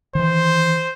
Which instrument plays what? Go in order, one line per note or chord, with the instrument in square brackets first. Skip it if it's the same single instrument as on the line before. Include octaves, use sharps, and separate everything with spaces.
[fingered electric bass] D#3 E3 [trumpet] C5